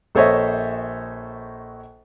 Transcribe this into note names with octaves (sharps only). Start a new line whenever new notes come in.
A#1 A4 C5 C#5 D#5 E5